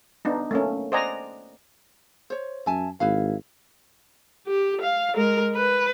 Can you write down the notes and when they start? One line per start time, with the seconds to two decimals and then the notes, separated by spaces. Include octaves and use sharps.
0.25 B3 D4 D#4
0.51 A3 A#3 C#4
0.92 C5 D5 D#5 F#5 G#5 A#5
2.30 C5 C#5
2.66 F#2 E5 G#5 A5
3.00 G#1 E4 B4 F5
4.46 G4
4.81 F5
5.16 G#3 A#4
5.56 B4